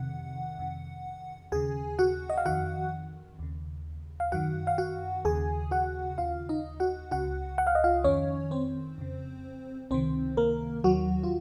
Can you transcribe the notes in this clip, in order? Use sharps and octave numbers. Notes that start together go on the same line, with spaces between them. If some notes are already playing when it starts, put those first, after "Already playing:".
Already playing: F2 C3 D#3 F#5
F2 C3 D#3
D#2 C#3 G#4 G#5
F#4 F#5
D#5
F5
F2 D#3 F#4 F#5
D#2 C#3
F5
F#2 D#3 F#4 F#5
F5
F#4 F#5
D#2 C#3 G#4 G#5
F#4 F#5
D#2 C#3 F4 F5
D#4 D#5
F#4 F#5
C#2 C#3 F#4 F#5
F#5
F5
D#5
F4 F5
F2 D#3 C#4 C#5
C4 C5
F2 C#3
C#2 C3 D#3 C4 C5
A#3 A#4
D#2 D#3 F#3 F#4
F4